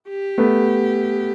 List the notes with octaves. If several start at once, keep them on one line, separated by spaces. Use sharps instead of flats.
G4
A3 B3